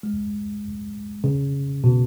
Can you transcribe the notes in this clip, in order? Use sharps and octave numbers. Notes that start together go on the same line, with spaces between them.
G#3
C#3
B2